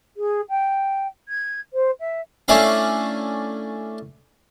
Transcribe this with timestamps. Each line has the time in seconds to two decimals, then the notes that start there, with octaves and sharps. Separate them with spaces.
0.16 G#4
0.49 G5
1.28 G#6
1.73 C5
2.00 E5
2.48 A3 C#4 D4 E4 F5